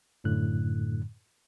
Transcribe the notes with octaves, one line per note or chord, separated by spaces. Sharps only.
F#2 A2 D3 F#6